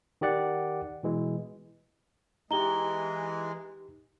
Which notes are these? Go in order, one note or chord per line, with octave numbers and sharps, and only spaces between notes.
D#3 G4 D5 F#5
B2 E3 G#3
E3 G#3 D#4 G4 A#5 G7